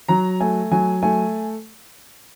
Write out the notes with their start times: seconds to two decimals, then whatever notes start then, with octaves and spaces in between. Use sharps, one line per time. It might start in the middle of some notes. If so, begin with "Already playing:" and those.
0.09 F#3 A#5
0.40 A3 G#5
0.71 F#3 G#5
1.02 A3 G#5